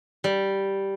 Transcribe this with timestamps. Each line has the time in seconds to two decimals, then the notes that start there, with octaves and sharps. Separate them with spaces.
0.24 G3